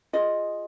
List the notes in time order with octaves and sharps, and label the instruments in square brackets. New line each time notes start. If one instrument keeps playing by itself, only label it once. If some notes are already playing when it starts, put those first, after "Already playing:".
[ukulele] F4 G#4 D#5